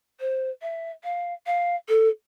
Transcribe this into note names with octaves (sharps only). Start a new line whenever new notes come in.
C5
E5
F5
F5
A4